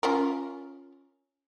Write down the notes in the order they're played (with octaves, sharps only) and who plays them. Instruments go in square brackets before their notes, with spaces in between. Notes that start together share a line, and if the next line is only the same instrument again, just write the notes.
[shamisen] C#4 F4 A#4